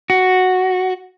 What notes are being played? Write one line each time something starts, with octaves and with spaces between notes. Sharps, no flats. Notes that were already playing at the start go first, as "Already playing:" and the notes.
F#4